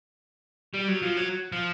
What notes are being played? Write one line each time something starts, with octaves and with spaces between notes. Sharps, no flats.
G3
F#3
F3
F#3
F3